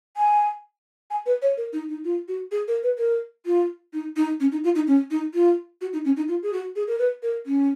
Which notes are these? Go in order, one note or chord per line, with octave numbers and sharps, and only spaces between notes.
G#5
G#5
B4
C#5
A#4
D#4
D#4
F4
F#4
G#4
A#4
B4
A#4
F4
D#4
D#4
C#4
D#4
F4
D#4
C#4
D#4
F4
F#4
D#4
C#4
D#4
F4
G#4
F#4
G#4
A#4
B4
A#4
C#4